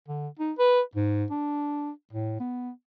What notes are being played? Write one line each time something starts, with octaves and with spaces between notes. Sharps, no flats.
D3
D#4
B4
G#2
D4
A2
B3